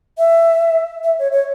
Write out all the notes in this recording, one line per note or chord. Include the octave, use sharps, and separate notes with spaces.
E5
E5
C#5
C#5